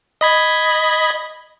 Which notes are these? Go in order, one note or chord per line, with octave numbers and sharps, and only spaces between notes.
D#5 B5 G#6